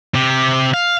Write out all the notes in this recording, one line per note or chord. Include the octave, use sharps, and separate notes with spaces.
C3 G4
F5